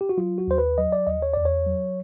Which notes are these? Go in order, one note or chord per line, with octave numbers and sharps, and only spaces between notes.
G4
F#4
F#3 F4
F#4
D#2 C5
B4
F#3 D#5
D5
D#2 D#5
C#5
E2 D5
C#5
F#3